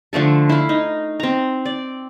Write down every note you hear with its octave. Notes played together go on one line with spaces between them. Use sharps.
D3 F3 A3 A4
E4 F5
D#4
C4 A#5
D5